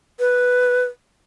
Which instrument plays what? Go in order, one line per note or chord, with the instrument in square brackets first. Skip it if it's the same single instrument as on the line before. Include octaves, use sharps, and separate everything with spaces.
[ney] B4